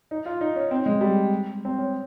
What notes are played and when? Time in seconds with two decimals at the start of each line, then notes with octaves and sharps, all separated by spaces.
0.11 D#4
0.26 F4
0.41 D#4
0.55 C#4
0.71 C4
0.86 G#3
1.01 G3
1.65 C4
1.78 C#4